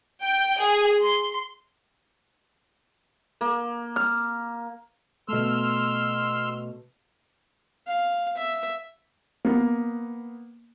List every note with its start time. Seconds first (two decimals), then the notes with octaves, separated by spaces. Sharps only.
0.24 G5
0.59 G#4
1.01 C6
3.41 A#3
3.96 F6
5.28 B2 A3 C6 E6 F6
7.88 F5
8.37 E5
9.45 A#3 B3